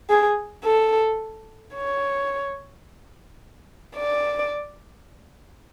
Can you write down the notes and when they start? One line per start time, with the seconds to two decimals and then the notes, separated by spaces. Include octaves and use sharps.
0.10 G#4
0.65 A4
1.75 C#5
3.96 D5